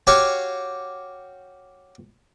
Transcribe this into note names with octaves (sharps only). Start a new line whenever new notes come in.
F#4 G4 C#5 F5